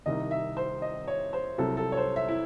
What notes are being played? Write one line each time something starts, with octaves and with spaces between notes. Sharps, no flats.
C2 C3 D#3 D#5
E5
C5
D#5
C#5
C5
C2 C3 F#3 C4 A4
A4
C#5
C5
E5
E4